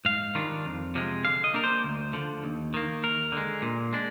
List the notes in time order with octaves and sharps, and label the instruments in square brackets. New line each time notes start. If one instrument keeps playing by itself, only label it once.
[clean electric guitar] G#2 F5
D#3 G3 D4 F4
F2
C3 F3 G#3
D3 F5
D#5
G3 A#3 D4 A#4
C5
D2
D3 F3
D#2
D#3 A#3
D#2 A#4
D3 G#3
A#2
G#3 D4